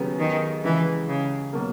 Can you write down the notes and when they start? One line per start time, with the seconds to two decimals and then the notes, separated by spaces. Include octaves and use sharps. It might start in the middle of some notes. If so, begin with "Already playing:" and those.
Already playing: D#2 C#3 F#3 B3
0.19 D#3
0.64 C#2 C#3 E3 G#3
1.08 C#3
1.53 B2 F#3 A#3